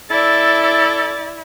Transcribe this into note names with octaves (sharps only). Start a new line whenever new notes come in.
E4 A4 D5 A6